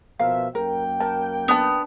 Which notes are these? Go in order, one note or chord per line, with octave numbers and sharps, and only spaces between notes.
B2 F3 A#4 E5 F5
F#2 A#3 A#4 G5
A#4 A5
B3 D4 B4 A5